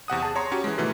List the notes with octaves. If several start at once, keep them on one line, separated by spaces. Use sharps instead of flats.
E2 C3 F#5 D#6
G#4 A5 D#6
C#5 A#5 C6
C#4 F#4 G4
E3 G#3
G#2 B2 D#3 E3 A3